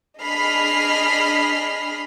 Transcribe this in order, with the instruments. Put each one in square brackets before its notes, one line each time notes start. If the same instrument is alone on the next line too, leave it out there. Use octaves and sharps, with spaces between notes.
[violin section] D4 G#4 D#5 B5 F6 C7